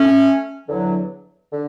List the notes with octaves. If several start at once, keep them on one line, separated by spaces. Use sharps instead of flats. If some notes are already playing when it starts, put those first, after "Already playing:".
Already playing: A3 C#4
E2 D3 F#3
D3